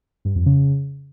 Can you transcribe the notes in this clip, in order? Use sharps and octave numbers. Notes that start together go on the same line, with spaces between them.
G2
F2
C#3